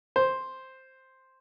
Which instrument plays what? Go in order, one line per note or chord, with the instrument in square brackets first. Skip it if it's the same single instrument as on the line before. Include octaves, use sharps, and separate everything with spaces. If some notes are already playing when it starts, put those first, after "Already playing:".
[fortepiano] C5